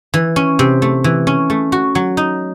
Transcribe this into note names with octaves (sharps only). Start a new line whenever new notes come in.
E3
C#4
C3
A3
E3
C#4
A3
F#4
F#3
D#4